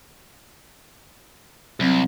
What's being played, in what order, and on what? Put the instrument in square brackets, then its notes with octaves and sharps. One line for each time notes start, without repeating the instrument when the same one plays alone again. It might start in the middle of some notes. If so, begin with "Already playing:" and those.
[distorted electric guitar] C2 [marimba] F#3 C4